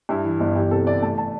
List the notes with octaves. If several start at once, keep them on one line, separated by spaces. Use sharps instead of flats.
G2 E4
E3
G1
E3 G4
C3 A4
E3 D5
A3 A5
A5